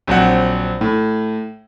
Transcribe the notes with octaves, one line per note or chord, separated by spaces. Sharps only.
A#1 F#3 C4 F#5
A2